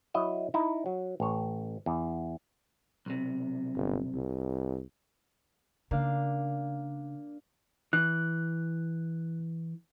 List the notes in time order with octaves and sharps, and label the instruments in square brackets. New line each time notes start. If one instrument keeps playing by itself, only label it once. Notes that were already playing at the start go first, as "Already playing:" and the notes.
[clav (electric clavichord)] F#3 E4 D#5 E5
D#4 E4
F#3
A1 C#5
E2
[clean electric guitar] B1 C3
[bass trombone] G1
C2
[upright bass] C#3 [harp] A#3 D4 F5
[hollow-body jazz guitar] E3 [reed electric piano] F#6